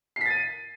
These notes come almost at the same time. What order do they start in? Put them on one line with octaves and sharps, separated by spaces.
C7 B6 A6 D#7